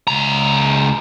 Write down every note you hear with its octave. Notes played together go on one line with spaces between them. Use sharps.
C#2 A#5